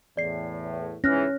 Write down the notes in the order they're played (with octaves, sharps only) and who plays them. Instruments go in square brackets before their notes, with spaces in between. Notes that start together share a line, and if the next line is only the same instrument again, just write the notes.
[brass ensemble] E2 A2 [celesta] D5 C7
[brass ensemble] E2 G#2 E3 [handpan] C#4 [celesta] F6 F#6 A#6